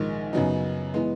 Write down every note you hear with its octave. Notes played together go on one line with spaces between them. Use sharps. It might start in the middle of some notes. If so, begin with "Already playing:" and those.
Already playing: A#1 G#2 D#3 G#3
F#2 C#3 F#3 B3 D#4
E3 G#3 B3